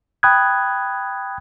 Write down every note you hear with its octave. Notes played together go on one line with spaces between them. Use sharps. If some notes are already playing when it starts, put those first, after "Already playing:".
G5 B5 D#6 F#6 G#6